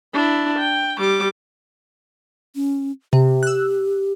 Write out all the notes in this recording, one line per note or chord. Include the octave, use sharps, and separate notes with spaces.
D4 E4
G5
G3 D6
C#4
C3 G4
E6 F#6